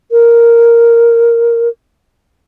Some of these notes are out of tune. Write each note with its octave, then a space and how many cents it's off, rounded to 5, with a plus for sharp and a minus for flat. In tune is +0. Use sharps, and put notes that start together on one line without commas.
A#4 +0